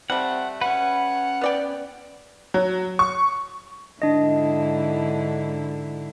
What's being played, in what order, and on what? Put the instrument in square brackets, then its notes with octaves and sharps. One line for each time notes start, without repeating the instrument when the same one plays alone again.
[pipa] G3 A3 [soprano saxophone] C4 [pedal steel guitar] F#5
[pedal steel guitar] C#4 B4 [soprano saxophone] F#5
[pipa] B3 D5 G5
[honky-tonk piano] F#3
C#6
[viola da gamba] G#2 D3 E4 [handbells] D4 D#5